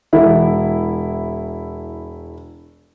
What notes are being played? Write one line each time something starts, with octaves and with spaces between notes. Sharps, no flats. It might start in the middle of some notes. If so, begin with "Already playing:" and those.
E1 E4